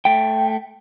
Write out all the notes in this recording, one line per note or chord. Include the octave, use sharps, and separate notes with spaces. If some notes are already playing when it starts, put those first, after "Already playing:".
A3 G5